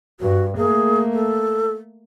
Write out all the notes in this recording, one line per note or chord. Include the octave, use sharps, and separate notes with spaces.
G2 F#4
A3 A#3 G#4
A4